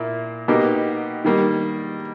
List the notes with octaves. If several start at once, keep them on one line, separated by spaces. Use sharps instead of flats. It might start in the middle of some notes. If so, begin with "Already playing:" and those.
Already playing: A#2 A#3 E4
B2 A#3 D#4 G4
D#3 G3 A#3